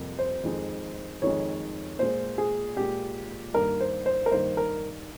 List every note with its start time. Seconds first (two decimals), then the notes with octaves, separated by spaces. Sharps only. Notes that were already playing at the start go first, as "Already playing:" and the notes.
Already playing: F2 C3 G3 A#3
0.19 C5
0.44 F2 D#3 G#3
1.22 F2 D#3 G#3 C#5
1.99 A#2 G#3 C5
2.38 G#4
2.76 A#2 G#3 G4
3.54 G2 D#3 A#3 A#4
3.81 C5
4.06 C5
4.26 A#4
4.31 G2 D#3 A#3 C5
4.57 A#4